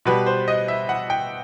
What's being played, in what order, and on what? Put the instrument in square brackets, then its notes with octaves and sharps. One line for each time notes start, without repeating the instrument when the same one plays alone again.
[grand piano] B2 G3 B4
C5
D#5
E5
F#5
G5